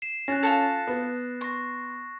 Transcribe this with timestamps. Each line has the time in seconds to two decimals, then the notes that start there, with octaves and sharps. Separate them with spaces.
0.02 C7 E7
0.28 C#4 F#6 A6 A#6
0.43 F4 G#4 A4
0.87 B3
1.41 C6 C#6 A#6